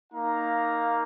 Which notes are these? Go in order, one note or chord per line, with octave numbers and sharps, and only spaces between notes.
A#3 D#4 F5 A#5